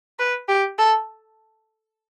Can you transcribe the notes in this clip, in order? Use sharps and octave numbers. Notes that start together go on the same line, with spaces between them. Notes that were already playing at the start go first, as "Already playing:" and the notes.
B4
G4
A4